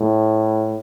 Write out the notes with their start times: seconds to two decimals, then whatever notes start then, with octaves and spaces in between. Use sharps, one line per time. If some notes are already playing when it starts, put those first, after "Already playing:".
Already playing: A2